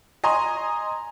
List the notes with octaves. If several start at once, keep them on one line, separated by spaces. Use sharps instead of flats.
D#5 G#5 A#5 C6